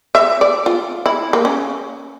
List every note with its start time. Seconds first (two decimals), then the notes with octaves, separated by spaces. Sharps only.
0.15 E5
0.41 D5
0.66 F4
1.06 E4
1.33 A#3
1.45 C#4